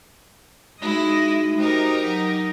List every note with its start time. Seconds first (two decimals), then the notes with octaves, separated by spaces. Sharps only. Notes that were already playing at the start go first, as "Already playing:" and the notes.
0.82 G#3 D#4 E4 F#4 D#5 E5
1.58 D#4 F#4 G4 A#4 C5
2.04 F#3 D#4